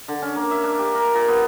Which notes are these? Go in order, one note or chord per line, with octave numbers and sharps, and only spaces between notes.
D3
C#4
A#3
E5
D4
G4
A#4
A#2
B3